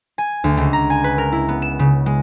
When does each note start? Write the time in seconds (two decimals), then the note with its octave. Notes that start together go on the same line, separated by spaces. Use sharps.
0.18 G#5
0.44 D2
0.57 C#2
0.73 A#5
0.90 G#5
1.04 B4
1.18 A#4
1.32 E4
1.48 B3
1.62 E7
1.79 C#3
2.06 G#3